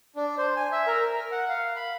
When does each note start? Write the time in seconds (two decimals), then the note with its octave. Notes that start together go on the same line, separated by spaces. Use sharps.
0.16 D4
0.38 C5
0.56 G#5
0.72 E5
0.87 A#4
1.12 A#4
1.32 F#5
1.49 F5
1.76 B5